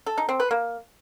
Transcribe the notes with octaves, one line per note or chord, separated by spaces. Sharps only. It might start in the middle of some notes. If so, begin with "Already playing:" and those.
A4
D#4
C4
B4
A#3